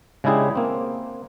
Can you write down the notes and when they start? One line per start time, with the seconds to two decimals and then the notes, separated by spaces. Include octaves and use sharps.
0.24 C#3 G#3 D4 E4 G4 G#4
0.56 A#3 C4